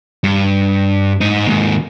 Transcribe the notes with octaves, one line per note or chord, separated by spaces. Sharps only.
G2
G#2 D#4
D#2 G#2